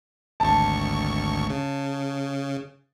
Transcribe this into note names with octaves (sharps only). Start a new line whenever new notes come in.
G#1 D2 A5 C#6
C#3